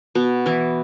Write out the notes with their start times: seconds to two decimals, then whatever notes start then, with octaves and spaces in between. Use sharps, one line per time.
0.15 B2 B3
0.46 E3 E4